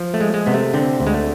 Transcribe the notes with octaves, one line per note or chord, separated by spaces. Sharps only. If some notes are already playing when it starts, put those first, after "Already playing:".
Already playing: F3
A3
G#3
G#3
C3 B3
A3
D3 C4
D2
G#3
A3